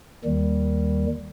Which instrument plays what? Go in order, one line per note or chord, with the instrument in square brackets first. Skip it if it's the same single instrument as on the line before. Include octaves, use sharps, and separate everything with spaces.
[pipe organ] D#2 D#3 G3